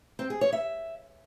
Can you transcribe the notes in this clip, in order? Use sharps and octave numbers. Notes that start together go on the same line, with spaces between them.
C4
G#4
C#5
E5